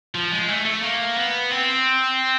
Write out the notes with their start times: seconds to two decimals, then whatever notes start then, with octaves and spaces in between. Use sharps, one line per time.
0.15 F3
0.32 G#3
0.48 A3
0.65 A3
0.82 A#3
1.16 B3
1.51 C4